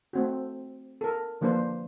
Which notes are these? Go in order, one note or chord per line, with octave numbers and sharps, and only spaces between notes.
A3 C4 F#4
A4 A#4
D3 F3 A#3 D4 B4 C5